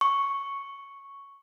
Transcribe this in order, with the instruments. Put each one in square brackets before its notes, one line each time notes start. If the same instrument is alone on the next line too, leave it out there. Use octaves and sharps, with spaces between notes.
[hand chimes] C#6